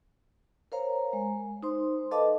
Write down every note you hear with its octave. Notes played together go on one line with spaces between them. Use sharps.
A#4 C5 C#5 F5 A#5
G#3
D#4 C5 C6
A4 B4 D#5 F5 A5 D6